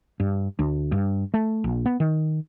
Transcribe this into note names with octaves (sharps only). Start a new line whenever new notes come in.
G2
D2
G2
A3
A#1
B3
D#3